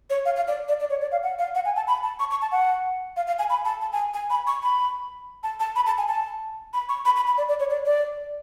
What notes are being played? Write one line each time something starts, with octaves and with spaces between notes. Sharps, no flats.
C#5
F5
F5
D5
D5
D5
C#5
D5
F5
F#5
F5
F#5
G#5
A5
B5
A5
C#6
C#6
A5
F#5
F5
F5
G#5
B5
A5
A5
G#5
G#5
B5
C#6
B5
A5
A5
B5
A5
G#5
A5
B5
C#6
B5
B5
B5
D5
D5
C#5
D5
D5